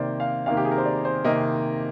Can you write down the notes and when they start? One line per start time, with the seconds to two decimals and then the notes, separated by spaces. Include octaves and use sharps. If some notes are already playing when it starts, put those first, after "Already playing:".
Already playing: C3 D#3 A#3 C5 D5
0.20 F5
0.46 C3 D#3 A#3 F5
0.57 G4
0.65 G#4
0.71 A#4
0.78 C5
0.85 D5
1.05 C5
1.24 C3 D#3 A#3 D#5